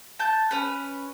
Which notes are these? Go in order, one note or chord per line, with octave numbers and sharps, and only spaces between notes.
A5 G6
C#4 B4